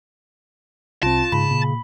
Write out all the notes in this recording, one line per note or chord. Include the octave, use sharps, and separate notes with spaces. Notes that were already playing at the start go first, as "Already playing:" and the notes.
C2 C4 F4 A5
G#2 C#3 B5
A#2